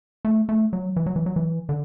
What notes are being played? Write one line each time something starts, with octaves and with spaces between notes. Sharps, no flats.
A3
A3
F#3
E3
F#3
E3
F#3
E3
D3